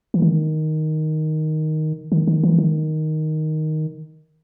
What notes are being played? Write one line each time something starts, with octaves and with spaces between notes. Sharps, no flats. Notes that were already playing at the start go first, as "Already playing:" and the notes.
E3
D#3
D#3
D#3
E3
D#3